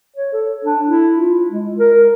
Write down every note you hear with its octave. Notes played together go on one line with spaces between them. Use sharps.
C#5
A4
D4
E4
F4
G#3
A#4